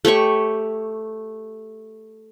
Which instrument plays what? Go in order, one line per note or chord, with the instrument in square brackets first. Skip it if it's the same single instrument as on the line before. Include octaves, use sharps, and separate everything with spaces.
[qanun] A3 G4 C#5 C#6